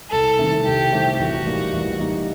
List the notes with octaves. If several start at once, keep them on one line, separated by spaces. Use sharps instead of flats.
C2 A4
C3 D#3 A3 C4
C2 G4
C3 D#3 A3 C4
A1 F#4
A2 G3 A#3 D#4
A1
A2 G3 A#3 D#4